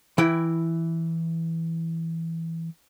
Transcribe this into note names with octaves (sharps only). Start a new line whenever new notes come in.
E3 E4 G5